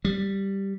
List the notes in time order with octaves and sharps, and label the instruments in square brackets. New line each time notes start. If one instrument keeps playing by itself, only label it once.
[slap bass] G3